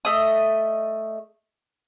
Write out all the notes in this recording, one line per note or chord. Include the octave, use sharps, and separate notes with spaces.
A3 D#5 D#6